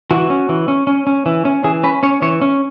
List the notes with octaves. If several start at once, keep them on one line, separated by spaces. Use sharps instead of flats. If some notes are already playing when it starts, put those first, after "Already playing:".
E3 F#4
C#4
E3
C#4
C#4
C#4
E3
C#4
E3 G#4
C#4 B4
C#4 C#5
E3 C#5
C#4